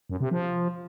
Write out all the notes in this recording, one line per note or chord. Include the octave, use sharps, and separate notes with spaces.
F#2
C3
F3